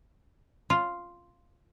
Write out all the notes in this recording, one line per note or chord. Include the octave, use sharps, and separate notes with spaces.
F4